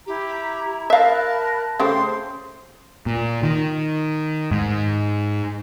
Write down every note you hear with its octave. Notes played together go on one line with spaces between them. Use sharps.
E4 G4 A#5
A#4 E5 F5 A5 B5 F#6
C#3 A3 G4 C5 C6
A#2
D#3
G#2